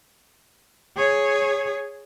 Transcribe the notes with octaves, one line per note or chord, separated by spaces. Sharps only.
G#4 C#5